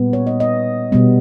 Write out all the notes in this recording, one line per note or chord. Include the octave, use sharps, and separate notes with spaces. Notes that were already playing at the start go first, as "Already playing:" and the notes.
Already playing: A#2 G3 B3
C#5
D#5
D#5
B2 G3 B3